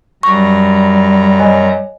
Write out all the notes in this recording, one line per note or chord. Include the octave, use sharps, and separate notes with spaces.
F#2 G3 A#5 C#6
C#5 D#5 G#5